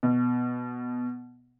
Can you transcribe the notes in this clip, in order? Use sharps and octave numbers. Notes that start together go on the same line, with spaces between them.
B2